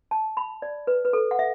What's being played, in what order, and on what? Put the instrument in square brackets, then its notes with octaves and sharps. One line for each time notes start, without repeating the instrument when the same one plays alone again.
[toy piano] A5
B5
D5
B4
B4
A4
F#5
E5